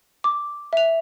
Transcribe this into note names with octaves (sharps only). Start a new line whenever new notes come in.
D6
E5 F7